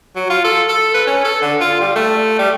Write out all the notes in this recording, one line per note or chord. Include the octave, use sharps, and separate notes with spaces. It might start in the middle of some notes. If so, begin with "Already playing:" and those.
F#3
F4
A4
A4
B4
C#4
A4
D3
F4
G3
A3
G3